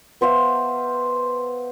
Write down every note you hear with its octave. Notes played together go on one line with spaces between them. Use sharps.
B3 C5 E5 F5